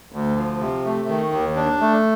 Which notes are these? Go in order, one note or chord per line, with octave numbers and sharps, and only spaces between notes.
D2
F3
C3
A3
D#3
D#2
D4
A3